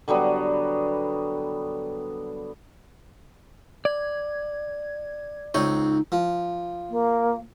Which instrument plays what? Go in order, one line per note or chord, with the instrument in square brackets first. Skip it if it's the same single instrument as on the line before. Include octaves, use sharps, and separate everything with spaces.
[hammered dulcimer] D3 F#3 G3 B3
[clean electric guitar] D5 [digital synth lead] G#6
[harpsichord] C#2 C4 C#5 [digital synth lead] D#4
[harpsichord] F3
[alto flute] A#3